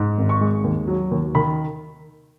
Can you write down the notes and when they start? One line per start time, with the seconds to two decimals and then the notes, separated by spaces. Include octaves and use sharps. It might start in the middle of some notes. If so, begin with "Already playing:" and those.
Already playing: G#2
0.18 G#1
0.29 C#6
0.41 G#3
0.64 D#2
0.87 F#3
1.11 D#2
1.35 D#3 B5